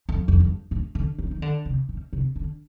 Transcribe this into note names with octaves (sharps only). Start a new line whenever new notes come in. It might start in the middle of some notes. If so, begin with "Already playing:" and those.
F2
F2
G2
A2
D3
D#3
D#3
D3
C3
A#2
C3
D3